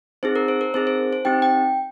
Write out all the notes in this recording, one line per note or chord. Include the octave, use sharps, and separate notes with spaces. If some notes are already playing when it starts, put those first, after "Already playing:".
C4 D#4 G#4 C5
A#4
C5
A#4
C4 D#4 G#4 C5
C5
C5
C4 D#4 G4 G5
G5